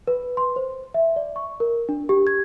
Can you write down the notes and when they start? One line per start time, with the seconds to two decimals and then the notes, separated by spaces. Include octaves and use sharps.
0.07 B4
0.37 C6
0.56 C5
0.94 E5
1.16 D5
1.36 C#6
1.60 A#4
1.89 D4
2.09 G4
2.27 G#6